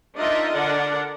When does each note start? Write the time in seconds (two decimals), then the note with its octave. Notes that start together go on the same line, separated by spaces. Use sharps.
0.16 D4 D#4 F4 A#4 D#5 E5
0.53 D3 D4 A#4 F#5